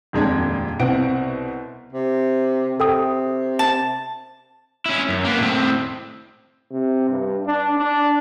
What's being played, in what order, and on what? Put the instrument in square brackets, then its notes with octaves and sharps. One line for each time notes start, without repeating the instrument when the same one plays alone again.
[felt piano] D#1 F2 G#3 D4 G#6
C2 B2 C4 F#5 D7
[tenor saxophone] C3
[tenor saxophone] C3 [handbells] A4 G5 D#6
[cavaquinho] A5
[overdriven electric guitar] C#4 E4
F#2
A#3 B3
A2 C4
[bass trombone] C3
G2
D4
D4